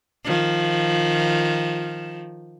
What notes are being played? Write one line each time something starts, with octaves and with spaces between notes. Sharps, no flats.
D#3 F3